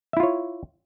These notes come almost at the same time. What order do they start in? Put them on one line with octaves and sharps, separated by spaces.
E5 E4 F4 C#5